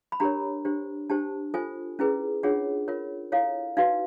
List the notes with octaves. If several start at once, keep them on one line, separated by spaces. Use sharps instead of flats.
B5
D4 G4 A#4 C#5 A#5
D4 G4 C5
D4 G4 C5 A5
F4 A4 C5 G#5
C#4 E4 G#4 B4
D4 F4 G#4 C#5 F#5
F4 A#4 C#5
E4 A4 C#5 F5
D#4 F#4 B4 F5